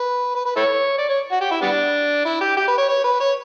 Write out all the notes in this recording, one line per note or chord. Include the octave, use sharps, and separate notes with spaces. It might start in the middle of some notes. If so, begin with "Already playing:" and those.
Already playing: B4
B4
B4
E4 A4 C#5
D5
C#5
F#4
G4
E4
G3 B3 D4
E4
G4
G4
B4
C#5
C#5
B4
C#5